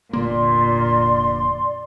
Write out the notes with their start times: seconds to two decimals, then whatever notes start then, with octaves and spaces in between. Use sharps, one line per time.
0.13 F1 A#2 D3 A#3 D5 C6